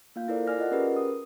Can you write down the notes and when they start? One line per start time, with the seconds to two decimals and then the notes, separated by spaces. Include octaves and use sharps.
0.16 A#3 F4 F5 G6
0.28 E4 A4 A#4 C5 D5
0.47 A#4 D5 G#5 F6 A#6
0.59 F4 D#5 F#5
0.71 C#4 G4 G#4 A#4 B4
0.96 D#6